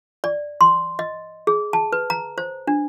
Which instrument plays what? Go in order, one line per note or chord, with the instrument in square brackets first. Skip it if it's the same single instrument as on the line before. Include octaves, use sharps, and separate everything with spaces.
[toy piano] D5
C6
D#5
G#4
A5
B4
A#5
C5
D4